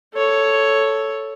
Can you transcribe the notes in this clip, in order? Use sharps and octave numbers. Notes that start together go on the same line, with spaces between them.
A4 C#5